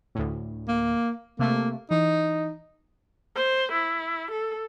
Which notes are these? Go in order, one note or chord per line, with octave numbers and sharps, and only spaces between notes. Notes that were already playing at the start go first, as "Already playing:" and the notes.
D2 A2
A#3
C3 A3 A#3
E3 D#4
C5
E4
A4